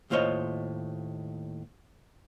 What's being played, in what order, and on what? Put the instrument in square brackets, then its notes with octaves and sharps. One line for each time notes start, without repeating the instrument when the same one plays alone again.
[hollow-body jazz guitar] D#2 A2 F4 C5 C#5 D#5